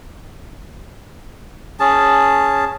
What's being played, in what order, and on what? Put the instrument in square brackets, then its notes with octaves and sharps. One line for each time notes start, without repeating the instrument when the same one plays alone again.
[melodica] C#4 G#4 A5